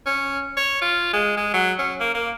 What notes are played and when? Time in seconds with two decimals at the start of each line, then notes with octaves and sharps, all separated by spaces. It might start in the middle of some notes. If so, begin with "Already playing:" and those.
0.06 C#4
0.57 C#5
0.81 F4
1.13 G#3
1.37 G#3
1.54 F#3
1.78 C#4
2.00 A#3
2.14 A#3